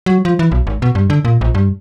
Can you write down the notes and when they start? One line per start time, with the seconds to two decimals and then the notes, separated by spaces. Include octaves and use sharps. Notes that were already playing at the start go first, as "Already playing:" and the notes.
0.06 F#3
0.25 F3
0.39 E3
0.52 B1
0.67 G#1
0.82 B2
0.95 G2
1.10 D3
1.25 A#2
1.41 A#1
1.55 G2